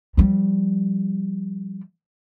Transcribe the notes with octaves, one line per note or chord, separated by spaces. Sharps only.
F3 G3